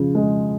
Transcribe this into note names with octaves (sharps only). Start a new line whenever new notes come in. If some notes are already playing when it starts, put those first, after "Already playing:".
Already playing: C#3 F3
G#3